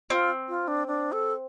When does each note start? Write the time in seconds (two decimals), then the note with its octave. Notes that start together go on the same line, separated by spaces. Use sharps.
0.10 C4 F4
0.49 F4
0.68 D4
0.87 D4
1.12 A4